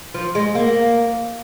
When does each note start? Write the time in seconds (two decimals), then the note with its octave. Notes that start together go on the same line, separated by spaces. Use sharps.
0.14 F3
0.35 G#3
0.55 A#3